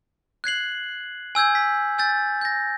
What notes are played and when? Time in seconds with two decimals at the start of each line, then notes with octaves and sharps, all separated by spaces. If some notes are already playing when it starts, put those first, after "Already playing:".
0.44 F#6 G#6 C7 F#7
1.35 G#5 E6 G6 G#6
1.55 B6
1.98 G#5 E6 G6 A6
2.41 G6 A#6